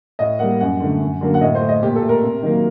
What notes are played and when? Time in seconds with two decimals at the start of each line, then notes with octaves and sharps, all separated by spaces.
0.19 A2 D#5
0.39 G3 A#3 F#5
0.60 F#2 F#5
0.80 D3 A3
1.00 F#2
1.21 D3 F#3 A#3
1.34 F#5
1.41 A2 D#5
1.55 C5
1.61 A3
1.69 D#5
1.83 A#2 G4
1.96 A4
2.02 A3
2.09 A#4
2.23 C3
2.43 D#3 F#3 A#3